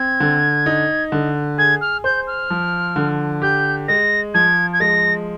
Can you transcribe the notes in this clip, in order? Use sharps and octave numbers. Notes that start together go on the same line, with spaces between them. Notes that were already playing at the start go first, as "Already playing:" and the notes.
Already playing: C4 G#6
D3
D#4
D3
G#4 G#6
F6
C5 G6
F6
F3
D3
G4 G6
G#3 A#6
F3 G#6
G#6
G#3 A#6